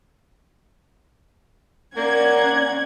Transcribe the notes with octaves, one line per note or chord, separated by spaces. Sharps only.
A#3 C#4 D5 F#5 G#6